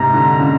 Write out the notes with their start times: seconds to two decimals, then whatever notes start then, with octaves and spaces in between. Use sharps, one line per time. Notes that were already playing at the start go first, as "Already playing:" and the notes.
Already playing: G#2 C3 A#5
0.14 D3
0.39 C#3